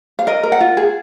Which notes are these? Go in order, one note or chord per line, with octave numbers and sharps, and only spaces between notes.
F5
A#4 D#5
A#4
F#5
F4
G#4